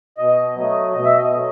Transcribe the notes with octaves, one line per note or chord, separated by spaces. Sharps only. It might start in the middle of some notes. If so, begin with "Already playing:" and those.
B2 D#5
F#3 A3 D#5
B2 D#5
E5
D#5
F#3 A3